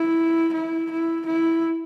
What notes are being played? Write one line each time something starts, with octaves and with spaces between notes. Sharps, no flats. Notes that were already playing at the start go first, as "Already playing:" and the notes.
Already playing: E4
E4
E4
E4